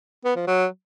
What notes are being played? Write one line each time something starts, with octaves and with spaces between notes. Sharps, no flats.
B3
F3
F#3